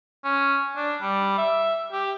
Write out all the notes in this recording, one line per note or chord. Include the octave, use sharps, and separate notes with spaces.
C#4
D4
G3
E5
G4